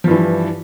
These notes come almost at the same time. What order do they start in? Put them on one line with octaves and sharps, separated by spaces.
F3 G2 E3